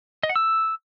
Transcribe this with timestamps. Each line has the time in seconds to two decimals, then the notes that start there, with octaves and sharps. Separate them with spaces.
0.23 D#5
0.29 F#5
0.36 E6